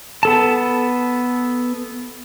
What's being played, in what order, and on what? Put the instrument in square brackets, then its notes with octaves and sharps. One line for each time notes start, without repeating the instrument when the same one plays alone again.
[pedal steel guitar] B3 A4 A5